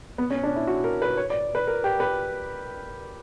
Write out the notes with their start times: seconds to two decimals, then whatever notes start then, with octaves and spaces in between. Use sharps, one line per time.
0.18 B3
0.30 C#4
0.43 D4
0.56 E4
0.67 F#4
0.84 A#4
1.02 B4
1.17 C#5
1.30 D5
1.55 B4
1.67 A#4
1.84 G4
2.00 B4